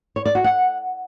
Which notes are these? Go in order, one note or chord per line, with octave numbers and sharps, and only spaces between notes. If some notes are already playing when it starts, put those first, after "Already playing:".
C#5
D5
F#4
F#5